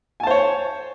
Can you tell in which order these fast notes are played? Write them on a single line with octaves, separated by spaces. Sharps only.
G#5 A5 C5 C#5